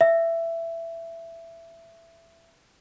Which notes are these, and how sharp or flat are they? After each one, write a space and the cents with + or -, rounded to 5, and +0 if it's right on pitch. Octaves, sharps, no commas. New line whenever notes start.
E5 +15